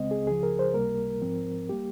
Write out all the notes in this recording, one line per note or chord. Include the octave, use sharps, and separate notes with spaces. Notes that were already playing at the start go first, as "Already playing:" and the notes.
Already playing: C#2 C#3 G#3 C4 D#5
G#4
C#2 C#3 F3 G#4
A#4
C5
C#2 C3 G3 A#3 A#4
G#2 F3 C4
G3 A#3 G4